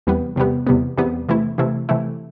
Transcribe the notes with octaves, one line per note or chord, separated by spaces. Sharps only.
E2 C3 G3 B3
E2 C3 G3 B3
E2 C3 G3 B3
E2 C3 G3 B3
C3 E3 A3 E4
C3 E3 A3 E4
C3 E3 A3 E4